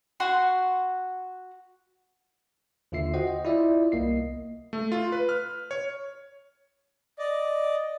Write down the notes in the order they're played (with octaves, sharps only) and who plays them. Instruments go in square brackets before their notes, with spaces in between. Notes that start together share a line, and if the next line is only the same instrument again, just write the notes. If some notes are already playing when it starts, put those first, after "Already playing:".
[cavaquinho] F#4 F#5 C6
[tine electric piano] D#2 D3 F4 E5 C7
F#4 C5 D#5 F#5 G5
D#5
E4 F4 D5 E5
C2 A#3 D#5 C7
[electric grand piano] A3
F4
B4
F6
C#5
[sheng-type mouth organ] D5 D#5